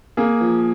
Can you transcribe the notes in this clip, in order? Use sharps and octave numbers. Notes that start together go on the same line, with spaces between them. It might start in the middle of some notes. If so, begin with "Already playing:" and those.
A#3 G#4
F3